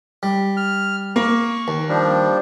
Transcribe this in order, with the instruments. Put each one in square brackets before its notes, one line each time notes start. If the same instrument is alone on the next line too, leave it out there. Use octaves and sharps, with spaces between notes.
[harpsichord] G3
[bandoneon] F6
[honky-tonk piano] A#3 [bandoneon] C#6
[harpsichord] D#2
[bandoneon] F3 G3 D4